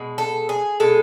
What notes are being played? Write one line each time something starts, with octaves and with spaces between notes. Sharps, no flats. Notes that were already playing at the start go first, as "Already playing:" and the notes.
Already playing: B2 G#3
A4
G#4
B2 G#3 A4